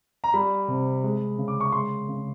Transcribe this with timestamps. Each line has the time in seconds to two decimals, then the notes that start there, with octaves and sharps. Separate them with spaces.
0.24 A#5
0.34 G3 B5
0.68 C3
1.04 G#3
1.38 C#3
1.48 D6
1.61 C#6
1.72 G#3 C6
2.08 C#3